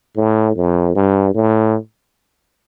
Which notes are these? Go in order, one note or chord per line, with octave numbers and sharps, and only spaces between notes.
A2
F2
G2
A2